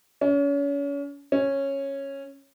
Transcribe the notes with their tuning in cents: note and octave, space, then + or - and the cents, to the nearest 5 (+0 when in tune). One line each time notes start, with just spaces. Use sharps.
C#4 +35
C#4 -10